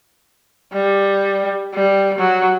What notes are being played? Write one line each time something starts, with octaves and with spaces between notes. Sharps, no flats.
G3
G3
F#3